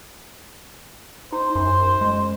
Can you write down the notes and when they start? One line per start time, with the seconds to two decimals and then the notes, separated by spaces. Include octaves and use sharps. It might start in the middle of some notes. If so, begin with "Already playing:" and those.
1.32 D#4 C5
1.55 F#2
2.01 G#3